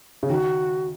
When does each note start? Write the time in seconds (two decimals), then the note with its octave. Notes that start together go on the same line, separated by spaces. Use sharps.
0.23 C#3
0.30 D#3 F#4